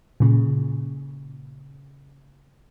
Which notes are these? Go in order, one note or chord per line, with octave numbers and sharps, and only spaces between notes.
A#2 C#3